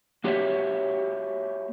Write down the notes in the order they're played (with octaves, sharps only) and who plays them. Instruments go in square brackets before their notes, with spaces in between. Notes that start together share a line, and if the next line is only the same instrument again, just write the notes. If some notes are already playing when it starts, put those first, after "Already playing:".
[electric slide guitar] A#3 F#4 G4 B4 C#5 E5